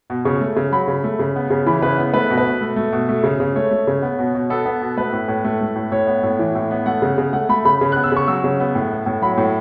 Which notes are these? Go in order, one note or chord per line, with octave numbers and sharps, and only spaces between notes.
B2
C#3 C#6
A3
C#3
F#3 B5
C#3
A3
C#3
B3
C#3
E3 B5
C#3 B4
B3
A3 B4
B2
B4
B2
A3
A3
B2
A3
C#3
C#3
A3 C#5
A3
C#3
B3
B2
B2
B3 A4
B3
B2
A3 B4
A2
A2
A3
A3
A2
A2 C#5
B3
A2
E3
A2
B3
A3 F#5
C#3
C#3
A3 F#5
A3 B5
C#3 B5
C#3
B3 F#6
E6
C#3 C#6
F#3 E6
C#3
B3
A2
B3
A2
F#3 B5
A2